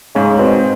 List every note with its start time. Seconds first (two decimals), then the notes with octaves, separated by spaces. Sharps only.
0.15 G#2 C#3
0.39 B2 C4